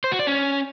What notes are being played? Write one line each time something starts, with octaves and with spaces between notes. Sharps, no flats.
C5
F#4
D5
C#4